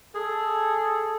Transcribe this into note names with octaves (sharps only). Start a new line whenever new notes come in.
G#4 A4